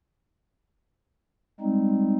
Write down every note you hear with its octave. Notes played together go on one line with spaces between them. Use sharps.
G3 G#3 C4 D#4